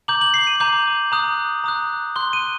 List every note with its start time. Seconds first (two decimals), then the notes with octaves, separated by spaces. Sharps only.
0.08 A#5 D6 G6 F#7
0.21 F#7
0.34 C7
0.47 D#7
0.60 A#5 D6 G6 F#7
1.12 A#5 D#6 F#6
1.64 A#5 D#6 F#6
2.16 C6 F#6 G7
2.33 D#7